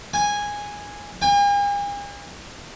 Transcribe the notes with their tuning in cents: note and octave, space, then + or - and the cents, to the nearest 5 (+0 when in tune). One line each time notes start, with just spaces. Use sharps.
G#5 -10
G#5 -45